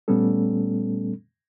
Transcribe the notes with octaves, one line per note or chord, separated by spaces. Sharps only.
A#2 G3 A3 B3 C#4 A4